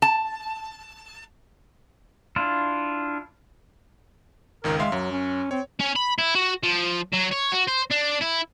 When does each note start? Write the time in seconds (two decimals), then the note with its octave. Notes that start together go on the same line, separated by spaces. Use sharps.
0.02 A5
2.36 D4 E4 F4
4.64 G#1 C#2 D#3 A#4
4.79 G#3 E5 F5 C6
4.92 F#2 F#3
5.12 C#4
5.51 C4 C#5
5.80 C#4
5.96 B5
6.18 E4
6.35 F#4
6.63 F3
7.14 F#3
7.33 C#5
7.53 F#4
7.68 C5
7.91 D4
8.22 E4